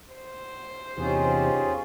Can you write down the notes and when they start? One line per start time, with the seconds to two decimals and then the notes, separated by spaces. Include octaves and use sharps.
0.14 C5
0.98 E2 C3 C#4 D#4 F4 G4 G#4